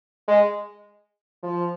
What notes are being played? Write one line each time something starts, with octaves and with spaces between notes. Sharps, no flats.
G#3
F3